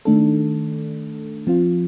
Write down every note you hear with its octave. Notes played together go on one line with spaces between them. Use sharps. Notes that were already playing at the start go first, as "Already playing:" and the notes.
D#3 A3 D4 A4
F3 C4 F4